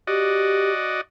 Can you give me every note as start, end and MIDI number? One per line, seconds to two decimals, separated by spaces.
0.07 1.01 66
0.07 0.71 67
0.07 1.01 74
0.07 1.01 75